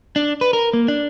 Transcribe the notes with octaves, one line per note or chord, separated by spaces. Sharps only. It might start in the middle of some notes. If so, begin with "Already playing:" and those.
D4
B4
A#4
A#3
D4